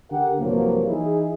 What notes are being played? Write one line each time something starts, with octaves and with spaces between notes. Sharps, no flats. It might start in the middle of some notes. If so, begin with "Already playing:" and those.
D3 G4 A#4 F#5
C2 G2 F3 F#3 A#3
E3 D#4 E4 G#4